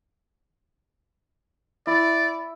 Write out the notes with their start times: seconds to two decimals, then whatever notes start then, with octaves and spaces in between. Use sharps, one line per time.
1.87 E4 D5